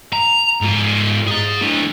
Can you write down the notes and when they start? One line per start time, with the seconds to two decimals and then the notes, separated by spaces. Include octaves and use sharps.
0.13 A#5
0.61 G#2 F4
1.27 G#4 A#5
1.62 D3 E4